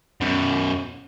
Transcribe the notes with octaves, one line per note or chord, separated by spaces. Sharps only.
F#2 B2